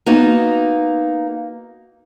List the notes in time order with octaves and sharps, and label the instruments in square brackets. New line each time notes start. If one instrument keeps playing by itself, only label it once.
[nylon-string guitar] A#3 B3 D#4 F#4